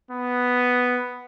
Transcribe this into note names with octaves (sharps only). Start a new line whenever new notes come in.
B3